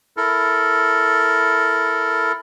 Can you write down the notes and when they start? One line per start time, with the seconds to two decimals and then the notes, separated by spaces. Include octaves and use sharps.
0.17 E4 A4 A#4